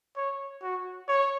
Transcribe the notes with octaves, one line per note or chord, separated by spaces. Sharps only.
C#5
F#4
C#5